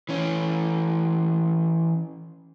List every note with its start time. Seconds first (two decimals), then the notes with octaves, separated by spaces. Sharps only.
0.09 E3 C#4